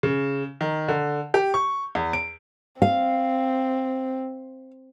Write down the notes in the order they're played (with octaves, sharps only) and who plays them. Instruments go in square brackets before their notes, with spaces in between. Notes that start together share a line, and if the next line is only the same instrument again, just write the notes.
[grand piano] C#3
D#3
D3
G4
C#6
E2
D7
[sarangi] C4 [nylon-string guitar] F5